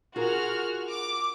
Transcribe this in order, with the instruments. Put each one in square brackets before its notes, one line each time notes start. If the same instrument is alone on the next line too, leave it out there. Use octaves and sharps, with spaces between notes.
[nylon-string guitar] F4 G#4 A#4 [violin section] F#4 F6
[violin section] D6